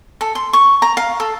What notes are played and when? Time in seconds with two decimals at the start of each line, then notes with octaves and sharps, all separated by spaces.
0.21 A4
0.35 C6
0.53 C#6
0.82 A#5
0.97 F5
1.20 A4